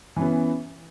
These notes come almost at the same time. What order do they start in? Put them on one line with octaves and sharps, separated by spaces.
E3 C#4 B3